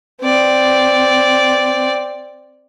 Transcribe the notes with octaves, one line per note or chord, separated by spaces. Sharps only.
C4 D5